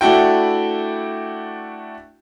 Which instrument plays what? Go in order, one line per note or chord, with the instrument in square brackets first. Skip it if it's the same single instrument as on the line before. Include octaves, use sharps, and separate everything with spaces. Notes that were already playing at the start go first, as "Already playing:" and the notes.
[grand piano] A3 D4 E4 F#4 G5